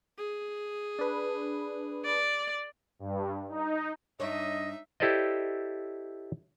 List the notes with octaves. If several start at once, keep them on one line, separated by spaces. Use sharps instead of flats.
G#4
D4 B4
D5
G2
D#4
G2 D4 D#4 C#5 D#5 E5
E4 G4 A4 C5 D5 D#5